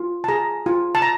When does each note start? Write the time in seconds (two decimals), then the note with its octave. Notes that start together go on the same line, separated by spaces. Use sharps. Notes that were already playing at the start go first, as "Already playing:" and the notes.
Already playing: F4
0.24 A5
0.28 G#4 A#5
0.66 F4
0.95 A5
1.02 A#5